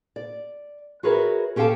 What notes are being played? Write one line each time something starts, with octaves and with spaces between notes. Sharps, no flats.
D5
F#4 G#4 A#4 B4 C#5 E5
C#4 G4 A4 F5 G5 A5